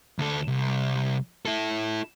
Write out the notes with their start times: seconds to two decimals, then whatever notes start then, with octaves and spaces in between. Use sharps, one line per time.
0.19 D2 A4
0.48 C2
1.46 E4 A4